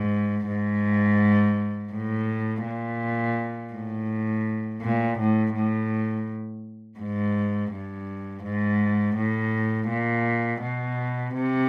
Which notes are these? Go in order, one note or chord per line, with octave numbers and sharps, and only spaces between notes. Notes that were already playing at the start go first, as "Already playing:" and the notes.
Already playing: G#2
G#2
A2
A#2
A2
A#2
A2
A2
G#2
G2
G#2
A2
A#2
B2
C3